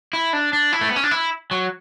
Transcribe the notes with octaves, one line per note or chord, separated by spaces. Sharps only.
E4
D4
D4
E4
A3
B3
C#4
D4
E4
F#3